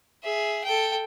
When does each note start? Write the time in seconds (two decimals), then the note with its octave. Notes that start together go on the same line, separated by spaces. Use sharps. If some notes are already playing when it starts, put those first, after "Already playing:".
0.23 G#4 E5
0.64 A4 G5